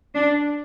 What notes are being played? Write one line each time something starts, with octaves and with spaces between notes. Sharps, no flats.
D4